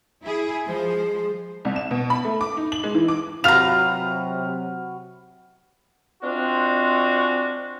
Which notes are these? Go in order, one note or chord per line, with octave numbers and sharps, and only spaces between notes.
E4 G#4
F3 G#3 G#4 C5
C2
E7
B2
B5
A3
D6
D#4
F#7
G#3
E3
D6
C3 F#3 F4 F#4 B4 A#5 F6 F7
G#3 C4 D4 F4 F#4